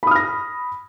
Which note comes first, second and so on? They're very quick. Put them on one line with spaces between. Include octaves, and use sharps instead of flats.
B5 D#6 F6 A#6